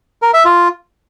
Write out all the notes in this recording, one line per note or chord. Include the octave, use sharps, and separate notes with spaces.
A#4
E5
F4